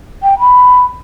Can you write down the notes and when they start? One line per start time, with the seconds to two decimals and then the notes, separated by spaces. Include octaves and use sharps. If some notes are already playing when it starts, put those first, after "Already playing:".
0.23 G5
0.40 B5